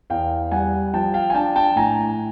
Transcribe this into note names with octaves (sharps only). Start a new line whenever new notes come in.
E2 F5 G5
G3 F#5 G#5
F3 G5 A5
F5 G5
G#5
D4 G5 A5
G5 A5
A2 G#5 A#5